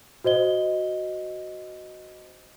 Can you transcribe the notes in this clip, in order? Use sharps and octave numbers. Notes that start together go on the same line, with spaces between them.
F#4 C5 D#5 G7